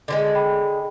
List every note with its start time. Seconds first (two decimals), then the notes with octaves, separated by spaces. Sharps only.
0.08 D3 F3 G#3
0.18 G#4
0.35 G5 B5